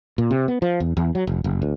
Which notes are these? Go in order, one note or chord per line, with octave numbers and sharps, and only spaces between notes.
A#2
C3
B3
F3
E2
E2
F#3
F1
F#1
D2